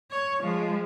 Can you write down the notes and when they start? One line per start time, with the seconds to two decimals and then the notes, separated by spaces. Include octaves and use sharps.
0.11 C#5
0.41 F3 G#3